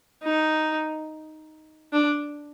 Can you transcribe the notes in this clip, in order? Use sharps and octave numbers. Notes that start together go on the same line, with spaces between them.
D#4
D4